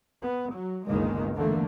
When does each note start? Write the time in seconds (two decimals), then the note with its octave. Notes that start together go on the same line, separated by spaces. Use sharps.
0.23 B3
0.55 F#3
0.88 G1 C#2 D#3 G#3 A#3
1.35 E2 D3 A3 A#3